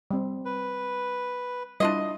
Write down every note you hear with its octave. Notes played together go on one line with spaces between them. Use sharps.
G3 C4
B4
G3 D4 E4 F4 D#5